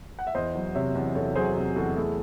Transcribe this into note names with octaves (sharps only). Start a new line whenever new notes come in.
F#5
E5
E2 C5 D#5
F#3
C3 C#5 E5
E2
E2 A4 C#5
F#3 G#4 C5
C3
E2 F#4 A4
A3 E4 G#4